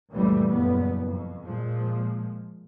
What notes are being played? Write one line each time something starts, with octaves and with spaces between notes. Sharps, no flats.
C#2 F#2 A#2 E3 G3 A3
F#1 E2 B3
F2
A#2 F3 G#3